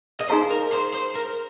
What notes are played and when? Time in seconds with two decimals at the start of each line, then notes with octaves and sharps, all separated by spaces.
0.21 D#5
0.29 D#4 G#4 C5 F5 A#5
0.50 A#4
0.73 C5
0.94 C5
1.16 A#4